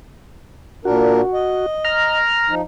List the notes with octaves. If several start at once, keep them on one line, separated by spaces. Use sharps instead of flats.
A#2 D4 F#4 A#4
D#5
A#5 F6
F3 D#4